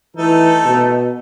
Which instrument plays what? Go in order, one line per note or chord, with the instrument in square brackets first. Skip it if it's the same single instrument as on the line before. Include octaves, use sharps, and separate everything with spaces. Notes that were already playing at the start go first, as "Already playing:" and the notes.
[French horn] E3 [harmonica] A3 D#4 A4
[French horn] B2